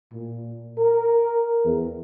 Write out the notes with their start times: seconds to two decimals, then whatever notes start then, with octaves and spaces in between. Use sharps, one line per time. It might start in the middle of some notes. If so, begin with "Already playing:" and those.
0.13 A#2
0.79 A#4
1.66 E2